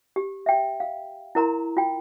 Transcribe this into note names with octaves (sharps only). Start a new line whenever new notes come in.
G4
E5 G5
F5
E4 A#4 A#5 C6
F4 G5